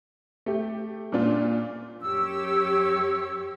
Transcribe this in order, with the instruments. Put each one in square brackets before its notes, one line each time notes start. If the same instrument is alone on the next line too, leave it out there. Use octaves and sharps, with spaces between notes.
[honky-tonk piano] A3 G4
A#2 C#4 D4 F4
[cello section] F#2 G4 C#5 [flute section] E6